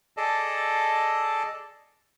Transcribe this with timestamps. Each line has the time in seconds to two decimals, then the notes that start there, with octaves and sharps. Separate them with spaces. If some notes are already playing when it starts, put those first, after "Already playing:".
0.17 G#4 A4 D5 D#5 A5